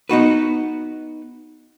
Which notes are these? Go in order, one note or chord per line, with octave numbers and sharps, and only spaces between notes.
B3 D#4 F#4 B4